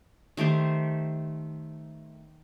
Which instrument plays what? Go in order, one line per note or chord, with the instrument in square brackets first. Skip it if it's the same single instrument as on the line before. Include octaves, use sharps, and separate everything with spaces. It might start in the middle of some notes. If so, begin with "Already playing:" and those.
[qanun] D#3 A3 G4 C5